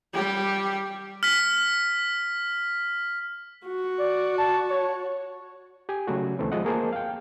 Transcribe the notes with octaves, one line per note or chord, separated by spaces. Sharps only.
G3 G4
F6 B6
F#4
D5
A5
C#5
G4 G#5
C#3 F#3 A3 F#4
C#2 D3 E3 A3 C4
F3 G#3 D#5 F#5
A#3 G#4 A#4 C5 A5
F5 G5